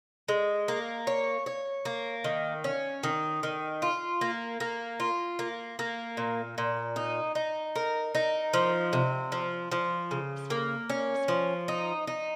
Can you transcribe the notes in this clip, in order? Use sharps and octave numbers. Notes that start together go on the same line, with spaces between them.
G#3
A#3
C#5
C#5
A#3
D#3
C#4
D#3
D#3
F4
A#3
A#3
F4
A#3
A#3
A#2
A#2
D#4
D#4
A#4
D#4
F3
C3
F3
F3
C#3
A#3
C#4
F3
D#4
D#4